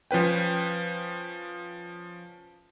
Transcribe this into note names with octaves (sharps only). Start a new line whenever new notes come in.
F3 C#4 B4 G5